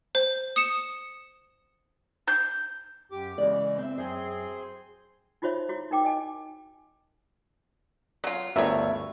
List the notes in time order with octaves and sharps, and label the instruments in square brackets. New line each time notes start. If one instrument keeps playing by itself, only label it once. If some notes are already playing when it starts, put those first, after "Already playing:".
[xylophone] C5
D#6 C#7 E7
[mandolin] G6
[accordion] F#2 G4 D6
[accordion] C#3 E3 G#3 [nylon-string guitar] D5
[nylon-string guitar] C4 E5
[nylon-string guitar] F#2 E5 [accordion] C4 G#4 C6
[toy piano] D#4 F4 F#4 C5 C#5 E5
E4 F#4 C#5
D#4 A#4 G5 D6
D#5 F5 G#5 D6
[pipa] F#3 F4
[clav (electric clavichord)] G1 D2 G2 [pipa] A#4 C#5 [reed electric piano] E5